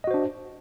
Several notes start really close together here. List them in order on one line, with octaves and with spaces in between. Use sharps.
D#5 F#4 C5 D4